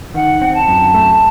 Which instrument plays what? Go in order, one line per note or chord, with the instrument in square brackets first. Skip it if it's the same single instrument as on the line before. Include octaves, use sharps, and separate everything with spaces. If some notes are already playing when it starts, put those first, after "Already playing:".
[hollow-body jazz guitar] D#3 [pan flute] F#5
[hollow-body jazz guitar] C4
[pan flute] A5
[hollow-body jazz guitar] F#2
A3